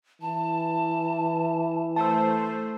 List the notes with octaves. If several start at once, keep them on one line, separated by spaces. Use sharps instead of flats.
E3 A5
A3 C5 A5 E6